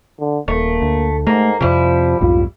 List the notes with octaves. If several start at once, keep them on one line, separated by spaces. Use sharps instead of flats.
D3
D#1 A3 A#3
D2
G#2 A3 A#3
F2 C3 F3 G3 E4
B1 F2 G#2 F4